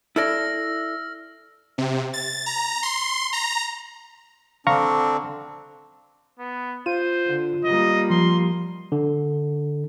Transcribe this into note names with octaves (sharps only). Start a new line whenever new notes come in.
E4 A4 D5 E6 F6 A#6
C3
A6
A#5
C6
A#5
D3 C4 D4 F5 A#5 C#6
B3
F4 C5 D#7
D3
G3 A#3 D#5
F3 C6
D3